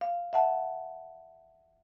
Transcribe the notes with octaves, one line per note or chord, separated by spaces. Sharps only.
F5
E5 F#5 A5